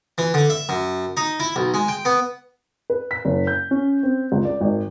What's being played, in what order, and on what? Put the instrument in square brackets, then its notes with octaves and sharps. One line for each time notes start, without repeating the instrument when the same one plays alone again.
[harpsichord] E3
D3
E5
F#2
D#4
E4
B1
G#3
G5
B3
[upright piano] B4
B6
F#1
G6
C#4
C4
C#2
D5
G#1